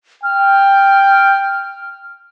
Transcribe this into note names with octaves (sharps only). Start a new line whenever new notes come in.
G5 F6